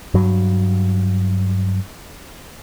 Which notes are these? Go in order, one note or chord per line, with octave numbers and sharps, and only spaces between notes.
G2 F#3